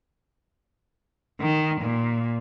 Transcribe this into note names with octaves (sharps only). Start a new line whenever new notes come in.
D#3
A#2